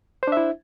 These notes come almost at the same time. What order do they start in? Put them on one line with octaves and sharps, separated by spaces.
C5 D4 E5 E4